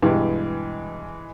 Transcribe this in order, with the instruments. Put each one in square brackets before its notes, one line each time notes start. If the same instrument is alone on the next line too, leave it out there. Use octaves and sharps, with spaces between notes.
[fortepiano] G2 B2 G4 [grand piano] E3 G#3